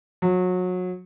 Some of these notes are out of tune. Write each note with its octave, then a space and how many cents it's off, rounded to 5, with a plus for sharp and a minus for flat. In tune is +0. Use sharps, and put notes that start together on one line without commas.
F#3 -25